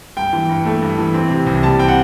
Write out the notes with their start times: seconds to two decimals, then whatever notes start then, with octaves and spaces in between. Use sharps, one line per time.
0.17 G2 G5
0.33 E3
0.49 G2
0.65 A3
0.82 G2
0.98 E3
1.14 C4
1.30 C3
1.46 C2
1.63 G3 A5
1.79 C4 G5
1.88 F#5